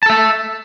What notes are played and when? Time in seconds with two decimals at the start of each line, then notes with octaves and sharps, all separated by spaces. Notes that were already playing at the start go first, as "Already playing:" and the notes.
0.03 A5
0.06 A4
0.10 E5